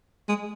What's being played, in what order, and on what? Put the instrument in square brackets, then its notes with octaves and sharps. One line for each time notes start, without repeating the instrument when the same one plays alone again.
[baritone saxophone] G#3